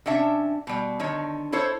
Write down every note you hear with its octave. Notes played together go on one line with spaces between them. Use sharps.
C3 C#4 D4 E5
B2 G3
D3 D#3 C#5
E4 A4 C5 C#5